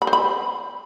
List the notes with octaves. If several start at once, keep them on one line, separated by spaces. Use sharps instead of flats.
B5
C5
B5